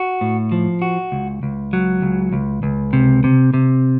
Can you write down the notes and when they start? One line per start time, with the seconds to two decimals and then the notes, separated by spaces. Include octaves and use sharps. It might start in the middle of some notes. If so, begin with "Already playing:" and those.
Already playing: F#4
0.21 A2
0.52 F3
0.82 F#4
1.12 C#2
1.43 C#2
1.73 F#3
2.02 C#2
2.33 C#2
2.63 C#2
2.93 C3
3.24 C3
3.54 C3